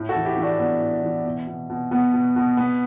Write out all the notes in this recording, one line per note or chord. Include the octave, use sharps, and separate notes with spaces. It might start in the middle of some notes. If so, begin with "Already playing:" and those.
Already playing: A2
F#4 A4
E3
E4 G4
E3
D4 F#4
A2 B3 D4
A2
E3
B2
B2
B2
B2 B3
B2
B2
B2 B3